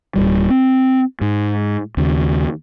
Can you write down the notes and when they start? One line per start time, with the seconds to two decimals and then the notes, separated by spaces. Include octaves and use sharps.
0.16 D1 G1 G3
0.50 C4
1.21 G#2
1.97 D#2 C#3